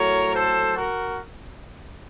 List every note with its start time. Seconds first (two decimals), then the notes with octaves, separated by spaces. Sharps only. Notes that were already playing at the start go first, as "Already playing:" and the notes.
Already playing: A2 F#3 A#4 C#5
0.33 A4 C5
0.75 F#4 A#4